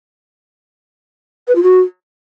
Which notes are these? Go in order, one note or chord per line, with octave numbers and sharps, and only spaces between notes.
B4
F4
F#4